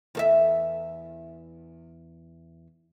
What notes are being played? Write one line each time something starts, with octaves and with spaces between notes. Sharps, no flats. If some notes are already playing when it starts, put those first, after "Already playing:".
E2 A4 E5